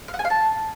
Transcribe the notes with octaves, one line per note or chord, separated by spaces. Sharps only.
F5
F#5
G#5
F5
A5